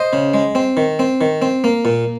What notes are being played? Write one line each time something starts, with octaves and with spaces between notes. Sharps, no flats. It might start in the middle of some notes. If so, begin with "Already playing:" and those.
Already playing: C5 D#5
C#3
G#3
C4
D#3
C4
D#3
C4
A#3
A#2